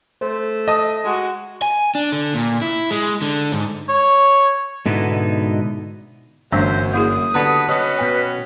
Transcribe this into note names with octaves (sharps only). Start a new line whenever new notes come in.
A3 C5
D#5 A5 D#6
G#3 F#4
G#5
D4
D3
A#2
E4
G#3
D3
G#2
C#5
G#2 B2 D3 B3 D#4 E4
G1 F#2 E3 A3 D4 C5 E5
A#3 E4 G#4 D#6
D3 G3 B3 F#4 B4 A5
F#3 B3 C#4 B4 D#5
B2 G5